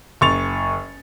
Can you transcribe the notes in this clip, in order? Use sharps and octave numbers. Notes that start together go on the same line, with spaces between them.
F#1 C#6 A6 F7